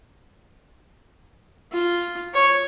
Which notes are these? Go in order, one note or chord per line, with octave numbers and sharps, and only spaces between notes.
F4
C#5